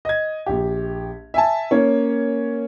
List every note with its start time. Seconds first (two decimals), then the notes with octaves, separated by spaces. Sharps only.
0.05 D#5 G#6
0.46 A#1 G4
1.34 E5 G#5 A5
1.71 A#3 C#4 C#5